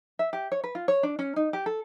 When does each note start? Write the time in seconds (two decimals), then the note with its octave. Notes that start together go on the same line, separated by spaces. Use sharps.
0.19 E5
0.33 G4
0.52 C#5
0.64 B4
0.75 F4
0.88 C#5
1.03 D4
1.19 C#4
1.36 D#4
1.53 G4
1.66 A4